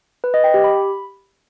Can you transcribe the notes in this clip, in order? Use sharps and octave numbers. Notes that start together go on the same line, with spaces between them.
B4
D#5
G5
G4
B5